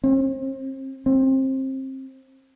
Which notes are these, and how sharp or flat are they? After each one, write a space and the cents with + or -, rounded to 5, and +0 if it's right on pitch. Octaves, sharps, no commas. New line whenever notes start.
C4 +40
C4 +25